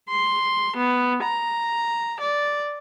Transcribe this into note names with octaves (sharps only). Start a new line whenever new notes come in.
C6
B3
A#5
D5